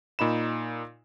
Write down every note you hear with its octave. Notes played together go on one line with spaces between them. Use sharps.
A#2 D#4 B5 E7